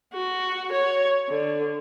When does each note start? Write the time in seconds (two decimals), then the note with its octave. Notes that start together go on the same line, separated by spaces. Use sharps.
0.13 F#4
0.72 C#5
1.29 D3